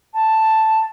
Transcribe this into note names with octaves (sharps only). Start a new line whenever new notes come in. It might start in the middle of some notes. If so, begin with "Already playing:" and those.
A5